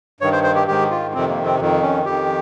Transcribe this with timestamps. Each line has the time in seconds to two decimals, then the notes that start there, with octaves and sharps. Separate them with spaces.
0.21 G2 D#3 C#5
0.33 C5
0.43 C5
0.55 G4
0.68 G#2 D#3 G4
0.91 F4
1.14 F2 C3 D#3 C4
1.29 A#3
1.45 C4
1.59 F2 D#3
1.82 C#4
2.05 F2 D#3 G4